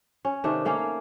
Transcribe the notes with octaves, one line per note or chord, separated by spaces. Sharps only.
C#4
C3 D#3 A3 D4
A3 A#3 C#4 F5